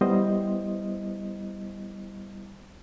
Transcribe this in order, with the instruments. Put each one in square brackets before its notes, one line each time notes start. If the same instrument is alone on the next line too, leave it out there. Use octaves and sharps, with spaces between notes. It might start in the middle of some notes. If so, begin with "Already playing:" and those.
[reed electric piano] G3 B3 E4 C5 D#5